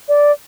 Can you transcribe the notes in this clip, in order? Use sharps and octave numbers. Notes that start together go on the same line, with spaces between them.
D5